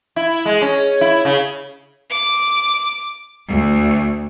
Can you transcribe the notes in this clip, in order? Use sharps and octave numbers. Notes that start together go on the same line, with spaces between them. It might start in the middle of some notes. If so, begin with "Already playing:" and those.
E4
G#3
C#4
E4
C#3
D6
D2